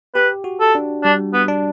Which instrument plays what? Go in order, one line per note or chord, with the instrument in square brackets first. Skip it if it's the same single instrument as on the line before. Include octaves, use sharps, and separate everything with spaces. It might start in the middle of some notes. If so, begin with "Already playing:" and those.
[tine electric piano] G4 [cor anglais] B4
[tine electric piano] F#4
[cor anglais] A4
[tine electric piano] D4
[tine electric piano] G3 [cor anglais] D4
[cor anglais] B3
[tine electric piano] D4